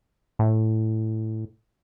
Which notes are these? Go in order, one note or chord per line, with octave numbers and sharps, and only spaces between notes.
A2